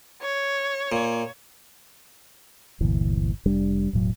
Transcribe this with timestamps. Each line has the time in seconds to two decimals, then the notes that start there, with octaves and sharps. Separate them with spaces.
0.22 C#5
0.92 A#2
2.81 G1 D2 A#2 E3
3.46 F1 G3 D4
3.93 E1 A2 F#3